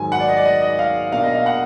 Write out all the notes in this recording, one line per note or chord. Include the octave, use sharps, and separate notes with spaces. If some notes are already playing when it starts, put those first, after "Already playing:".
Already playing: G#2 D#3 F#3 G#5
F#5
D5
D#5
D5
D#5
D#5
F5
B2 A#3 D4 F5
D#5
F5
F#5